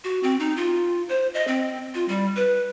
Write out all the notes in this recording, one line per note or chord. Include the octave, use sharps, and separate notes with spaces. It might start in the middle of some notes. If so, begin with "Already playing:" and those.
F#4
C4
D#4
F4
C5
D#5
C4
F4
G3
B4